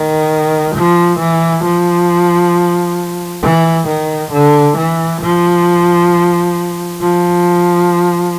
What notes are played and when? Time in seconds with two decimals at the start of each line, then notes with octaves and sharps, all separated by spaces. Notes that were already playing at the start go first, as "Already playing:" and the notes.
Already playing: D#3
0.75 F3
1.20 E3
1.64 F3
3.43 E3
3.88 D#3
4.32 D3
4.77 E3
5.21 F3
7.00 F3